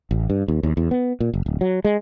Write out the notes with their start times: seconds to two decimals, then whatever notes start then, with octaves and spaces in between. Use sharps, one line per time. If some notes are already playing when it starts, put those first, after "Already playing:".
0.11 A1
0.30 G2
0.48 D#2
0.63 D#2
0.77 E2
0.91 B3
1.20 A#2
1.34 F#1
1.46 D1
1.61 F#3
1.85 G#3